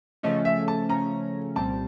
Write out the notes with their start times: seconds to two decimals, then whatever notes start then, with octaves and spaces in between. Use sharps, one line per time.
0.23 C#3 F3 A3 C#4 D#5
0.45 E5
0.68 A5
0.89 C#3 F3 A3 C#4 A#5
1.56 C2 A#2 G3 C4 A5